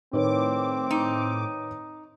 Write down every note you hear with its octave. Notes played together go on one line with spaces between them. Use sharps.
A2 D#3 C4 B4 C#5 D6
D#4